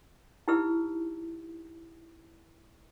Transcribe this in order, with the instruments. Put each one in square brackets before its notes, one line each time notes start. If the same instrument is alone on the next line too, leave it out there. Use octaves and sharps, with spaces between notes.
[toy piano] D#4 E4 G4 B4 E6